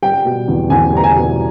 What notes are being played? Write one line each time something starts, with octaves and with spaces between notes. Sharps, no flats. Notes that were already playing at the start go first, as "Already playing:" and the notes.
G3 G5
B2
E2
E2 G#5
G3 A#5
G#5
B2